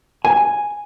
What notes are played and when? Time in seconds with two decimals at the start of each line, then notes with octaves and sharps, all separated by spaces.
0.25 G#5